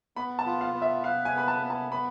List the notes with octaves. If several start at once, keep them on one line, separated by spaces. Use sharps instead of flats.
B3 B5
A5
F4
F5
B3
E5
B4 F5
G#5
B3 B5
A5
B3
A5
B3 B5